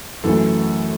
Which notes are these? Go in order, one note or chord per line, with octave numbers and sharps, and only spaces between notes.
F#2 E3 A3 A4